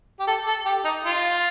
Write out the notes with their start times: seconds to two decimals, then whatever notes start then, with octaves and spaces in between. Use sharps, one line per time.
0.19 G4
0.27 A4
0.47 A4
0.65 G4
0.85 D#4
1.05 F4